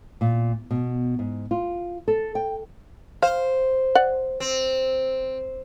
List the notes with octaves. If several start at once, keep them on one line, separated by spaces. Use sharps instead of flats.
A#2
B2
G#2
F4
A4
G5
C5 F5
D5 F#5
C4